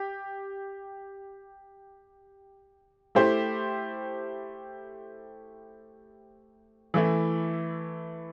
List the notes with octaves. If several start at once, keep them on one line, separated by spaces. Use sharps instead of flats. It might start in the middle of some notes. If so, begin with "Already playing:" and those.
Already playing: G4
A3 E4 G4 C5
E3 A3 E4